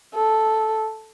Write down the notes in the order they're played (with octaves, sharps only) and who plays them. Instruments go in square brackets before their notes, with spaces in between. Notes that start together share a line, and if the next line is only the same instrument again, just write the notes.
[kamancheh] A4